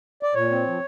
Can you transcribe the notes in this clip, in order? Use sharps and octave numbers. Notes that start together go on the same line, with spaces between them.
D5
A#2 C#5
C4
F3